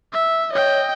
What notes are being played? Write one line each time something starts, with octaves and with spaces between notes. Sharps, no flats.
E5
C#5 D#5 G5